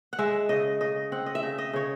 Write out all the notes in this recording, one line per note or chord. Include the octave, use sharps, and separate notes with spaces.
F#5
G#3 E5
C#3 D#5
C#3 D#5
C4 F#5
D#5
E5
C#3
D#5
C#3 C#5